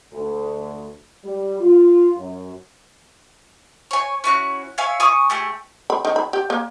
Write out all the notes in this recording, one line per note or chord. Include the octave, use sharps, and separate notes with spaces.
D2
G3
F4
F#2
C#5 G#5
C#4 E4 F#4 F#6
C#5 E5 F5 G#5
G#5 C#6 D#6
A3 G4 G#4
B5
D#3
B5
G4
A#3